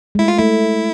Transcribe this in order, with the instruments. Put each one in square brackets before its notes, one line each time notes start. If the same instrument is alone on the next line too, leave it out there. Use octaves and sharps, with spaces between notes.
[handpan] G#3
[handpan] A3 [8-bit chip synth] E4
[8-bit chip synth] F4
[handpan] A3 [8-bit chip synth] E4